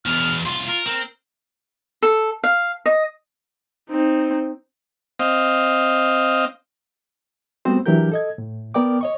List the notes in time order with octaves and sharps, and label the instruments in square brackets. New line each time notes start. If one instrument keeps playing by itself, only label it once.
[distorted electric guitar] E2 B2 [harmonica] F6
[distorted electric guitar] C2 F4 [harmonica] C6
[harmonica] F4 [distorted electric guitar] A#4
[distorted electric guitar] C4 [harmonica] A#4
[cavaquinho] A4
F5
D#5
[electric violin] C4 D#4
[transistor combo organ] C4 D#5 F5
[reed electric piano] G3 A3 B3 C4 F#4 C5
E3 F#3 D4 G4 A#4 G6
A4 D#5 G#6
A2
B3 A#4 D5 G5 D6
C#5 D#5 C#6